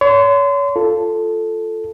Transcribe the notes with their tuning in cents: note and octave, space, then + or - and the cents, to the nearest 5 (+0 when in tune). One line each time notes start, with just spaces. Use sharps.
C#5 +35 C6 -35
F4 +0 A4 +0